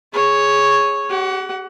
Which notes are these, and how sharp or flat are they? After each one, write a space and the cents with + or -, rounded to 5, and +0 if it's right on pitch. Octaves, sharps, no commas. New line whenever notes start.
G#4 +0 C#5 +0
G4 -40 F#5 +15